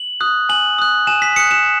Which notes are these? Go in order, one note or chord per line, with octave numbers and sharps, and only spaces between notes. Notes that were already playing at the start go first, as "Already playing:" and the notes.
Already playing: F#7
D#6 F#6
G#5 F#7
D#6 F#6
G#5 E7
B6
D#6 F#6 C#7
E7